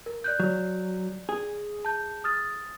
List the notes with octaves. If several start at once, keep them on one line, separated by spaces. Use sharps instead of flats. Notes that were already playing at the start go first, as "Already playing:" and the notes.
A#4
D5 F#6 G6
F#3
G#4
A5 G6
D#6 F6 A6